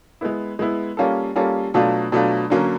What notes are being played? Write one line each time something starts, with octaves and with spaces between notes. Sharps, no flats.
G#3 B3 E4
G#3 B3 E4
G3 A#3 C#4 F4 A4
G3 A#3 C#4 F4 A4
B2 F#3 A3 D4 F4
B2 F#3 A3 D4 F4
D3 F#3 A#3 C#4